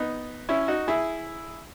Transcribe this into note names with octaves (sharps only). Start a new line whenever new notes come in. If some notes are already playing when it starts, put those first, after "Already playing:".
Already playing: B3 D#4
C#4 E4
D#4 F#4
E4 G#4